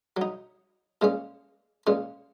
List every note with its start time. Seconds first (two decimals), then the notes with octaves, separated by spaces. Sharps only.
0.17 F#3 D#4
1.02 A#2 G#3 C#4
1.87 A#2 G#3 C#4